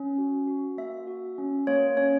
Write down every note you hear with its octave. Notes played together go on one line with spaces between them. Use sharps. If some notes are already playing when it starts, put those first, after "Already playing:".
Already playing: C#4
F#4
F#4
A#3 E5
F#4
C#4
A#3 C#5
C#4 C#5